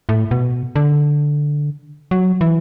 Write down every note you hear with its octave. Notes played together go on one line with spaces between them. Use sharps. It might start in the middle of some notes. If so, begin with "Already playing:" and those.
A2
B2
D3
F#3
E3